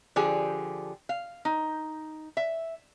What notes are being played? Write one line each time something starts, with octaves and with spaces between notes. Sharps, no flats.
D3 F3 G4 G#4
F5
D#4
E5